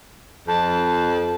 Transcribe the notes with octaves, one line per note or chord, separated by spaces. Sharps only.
F2 A5